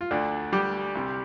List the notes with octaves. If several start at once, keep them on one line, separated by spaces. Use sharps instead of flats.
F4
D2 D3 D4
G3 G4
C2 C3